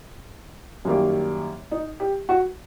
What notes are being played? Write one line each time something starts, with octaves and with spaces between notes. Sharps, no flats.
F#2 D#3 G3 A#3
D#4
G4
F#4